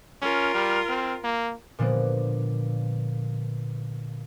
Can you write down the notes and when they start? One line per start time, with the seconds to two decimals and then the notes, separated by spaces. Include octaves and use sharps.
0.22 C#4 F4 A#4
0.54 G3
0.89 C4
1.24 A#3
1.79 A#2 D3 F3 A#3 B3